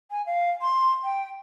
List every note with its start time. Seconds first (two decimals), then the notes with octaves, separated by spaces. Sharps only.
0.11 G#5
0.26 F5
0.61 C6
1.04 G5